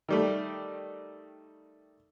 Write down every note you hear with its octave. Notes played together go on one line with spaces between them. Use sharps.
D#3 G3 A3